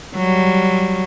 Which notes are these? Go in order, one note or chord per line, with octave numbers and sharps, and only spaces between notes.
F#3 G3